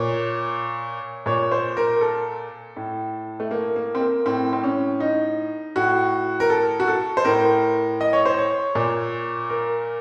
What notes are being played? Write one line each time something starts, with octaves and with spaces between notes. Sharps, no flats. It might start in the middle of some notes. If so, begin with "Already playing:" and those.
Already playing: A#2 C#5
A#2 C#5
C5
A#4
A4
A2
A3
A#3
A#3
C4
A#3
A2 C4
C4
C#4
D#4
A2 F#4
A#4
A4
F#4
A4
C5
A2 A#4
D#5
C#5
C5
C#5
A#2
A#4